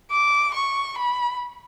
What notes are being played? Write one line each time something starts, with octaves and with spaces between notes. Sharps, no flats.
D6
C#6
B5